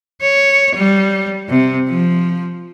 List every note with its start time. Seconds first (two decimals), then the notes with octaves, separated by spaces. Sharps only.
0.21 C#5
0.75 G3
1.49 C3
1.89 F3